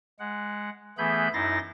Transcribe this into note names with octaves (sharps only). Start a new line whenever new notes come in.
G#3 F#5
E3 A3 B3 G#4 B5 G6
F#2 D#4 E4 C6 A6 A#6